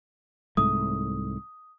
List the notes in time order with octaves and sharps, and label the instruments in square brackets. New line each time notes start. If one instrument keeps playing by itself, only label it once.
[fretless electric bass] C2 G#2 A3 [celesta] D#6